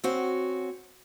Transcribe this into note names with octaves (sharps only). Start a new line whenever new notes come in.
C4 C#4 F#4